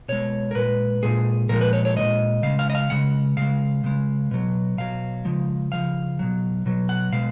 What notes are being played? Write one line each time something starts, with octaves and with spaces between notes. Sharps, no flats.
B2 G#3 C#5
A#4
A#2 G#3 B4
A#2 G#3 G#4
A#2 F3 G#3 A#4
B4
C#5
C#5
A#2 F3 G#3 D#5
C#3 G#3 F5
F5
D#5
F5
C#3 G#3 F#5
C#3 G#3 F5
C#3 G#3
B2 F#3
B2 F#3 F5
C#3 F3 G#3
C#3 F3 F5
B2 F#3
B2 F#3
F#5
B2 G#3 F5